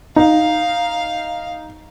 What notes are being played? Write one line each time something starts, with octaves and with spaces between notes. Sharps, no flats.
D#4 F5